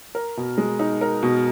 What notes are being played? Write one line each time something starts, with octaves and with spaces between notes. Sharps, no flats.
A#4
B2
G#3
D#4
A#4
B2